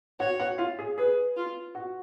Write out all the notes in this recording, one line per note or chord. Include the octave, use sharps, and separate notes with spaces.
F#4 C#5 F#5
F#4 F#5
F4 F5
G#4
G#4 B4
F4
F#4